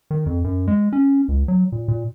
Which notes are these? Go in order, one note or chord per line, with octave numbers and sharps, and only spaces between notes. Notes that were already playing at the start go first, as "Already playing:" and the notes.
D#3
F2
F#2
G#3
C#4
C#2
F#3
A#2
A#2